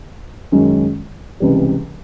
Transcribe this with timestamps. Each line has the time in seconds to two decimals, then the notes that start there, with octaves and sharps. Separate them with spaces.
0.52 F#2 D#3 G#3 C#4
1.40 C#2 C3 E3 G3